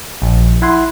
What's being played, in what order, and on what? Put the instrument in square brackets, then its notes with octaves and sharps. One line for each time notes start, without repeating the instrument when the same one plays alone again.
[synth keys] A#1
E4 F#5 G#5 C6